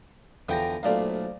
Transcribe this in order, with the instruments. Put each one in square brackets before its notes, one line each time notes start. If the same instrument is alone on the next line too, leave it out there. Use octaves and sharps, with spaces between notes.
[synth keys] E2 G5 A#6 [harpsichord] D3 E3 F3
[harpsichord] B1 A#2 A3 [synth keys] C5 D5 F5